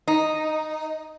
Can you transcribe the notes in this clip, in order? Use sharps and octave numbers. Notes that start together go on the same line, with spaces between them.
D#4